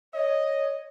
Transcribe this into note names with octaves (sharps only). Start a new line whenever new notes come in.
C#5 D#5